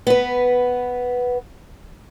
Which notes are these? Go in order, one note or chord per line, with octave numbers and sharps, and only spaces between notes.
B3 B4